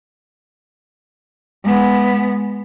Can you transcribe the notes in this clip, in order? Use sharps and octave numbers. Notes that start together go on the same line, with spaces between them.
G#3 B3